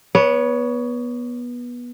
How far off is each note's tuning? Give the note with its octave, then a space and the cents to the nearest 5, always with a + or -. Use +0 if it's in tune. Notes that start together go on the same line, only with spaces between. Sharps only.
B3 -20 C#5 +20